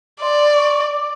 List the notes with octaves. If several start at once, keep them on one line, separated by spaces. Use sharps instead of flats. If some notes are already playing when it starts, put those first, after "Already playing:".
D5 C6
C#6
D6